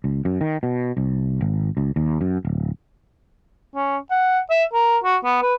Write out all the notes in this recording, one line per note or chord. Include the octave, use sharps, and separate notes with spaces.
C#2
F#2
D#3
B2
C2
G#1
C#2
D#2
F#2
D1
C#4
F#5
E5
A#4
F#4
B3
B4